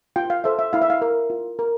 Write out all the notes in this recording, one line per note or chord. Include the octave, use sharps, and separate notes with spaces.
F4 G5
F5
A4 C5 E5
E5
E4 F5
E5
F5
A#4
F4
A#4